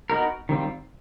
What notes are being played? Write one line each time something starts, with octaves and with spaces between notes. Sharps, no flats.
B3 D#4 F#4 A#4
D#3 G3 C4 F4